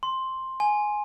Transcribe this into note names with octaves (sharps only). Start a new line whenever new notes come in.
C6
G#5